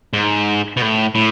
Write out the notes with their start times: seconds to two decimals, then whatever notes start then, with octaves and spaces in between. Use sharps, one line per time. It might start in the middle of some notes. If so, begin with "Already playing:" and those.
0.13 G#2
0.77 B2
0.82 A2
1.15 A2